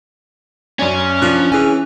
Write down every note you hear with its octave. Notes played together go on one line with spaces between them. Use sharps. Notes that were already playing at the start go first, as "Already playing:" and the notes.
F#2 C#4 D5 G#5
F3 A#3 D4 F4 F#6
E3 G#4 G#5